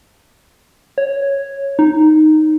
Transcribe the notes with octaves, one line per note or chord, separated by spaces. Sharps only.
C#5
D#4